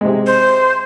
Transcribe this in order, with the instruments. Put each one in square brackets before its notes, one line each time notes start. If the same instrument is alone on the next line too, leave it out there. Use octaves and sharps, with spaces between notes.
[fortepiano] C3 G#3
[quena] C5